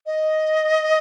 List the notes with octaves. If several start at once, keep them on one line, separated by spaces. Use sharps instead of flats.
D#5